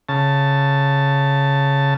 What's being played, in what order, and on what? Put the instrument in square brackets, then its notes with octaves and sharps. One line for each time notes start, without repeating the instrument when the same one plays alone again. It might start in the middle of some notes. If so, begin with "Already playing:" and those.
[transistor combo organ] C#3 A5